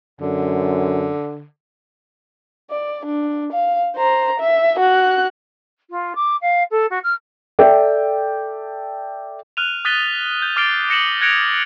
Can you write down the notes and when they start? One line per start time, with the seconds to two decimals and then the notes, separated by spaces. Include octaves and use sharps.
0.21 F#2 D3
2.70 D5
3.06 D4
3.53 F5
3.97 C5 A#5
4.40 E5
4.79 F#4 F#6
5.90 F4
6.15 D6
6.42 F5
6.71 A4
6.90 F#4
7.04 F6
7.59 A4 D5 E5 G5
9.57 F6 F#6 D#7 F7
9.85 D#6 F#6 A6 B6 D#7 G7
10.42 G6
10.56 D6 F6 A6 C7 D7 G7
10.89 D#6 A#6 C#7 D7 E7 F#7
11.21 F#6 G#6 A#6 C#7 D7 F7